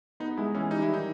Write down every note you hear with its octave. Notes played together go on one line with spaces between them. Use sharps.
B3 D#4
G#3 E4
E3 C#4
G3 D#4
E4
D#3
D#4